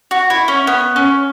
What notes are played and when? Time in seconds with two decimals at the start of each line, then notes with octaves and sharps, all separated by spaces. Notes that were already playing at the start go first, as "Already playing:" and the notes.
0.11 F#4
0.30 E4
0.48 C#4
0.67 B3
0.96 C#4